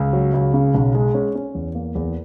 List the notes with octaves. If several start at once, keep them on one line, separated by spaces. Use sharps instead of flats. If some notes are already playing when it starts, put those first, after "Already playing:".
Already playing: C#2
F#3
C#2
C#3
B1
G#3
C#4
C#4
E2
A#3
E2